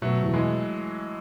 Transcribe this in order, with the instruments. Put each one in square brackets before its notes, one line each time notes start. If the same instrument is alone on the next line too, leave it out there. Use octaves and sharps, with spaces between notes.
[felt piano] B2 [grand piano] F#3 A3
[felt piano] E2
[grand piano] E3 G#3